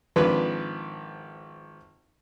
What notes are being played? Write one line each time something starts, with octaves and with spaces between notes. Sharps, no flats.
G#1 F3 D4 B4